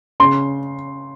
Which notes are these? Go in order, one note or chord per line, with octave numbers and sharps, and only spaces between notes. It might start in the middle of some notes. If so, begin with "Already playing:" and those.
C#3 C6